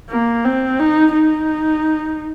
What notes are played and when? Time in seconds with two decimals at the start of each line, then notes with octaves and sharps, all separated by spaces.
0.10 A#3
0.45 C4
0.79 D#4
1.14 D#4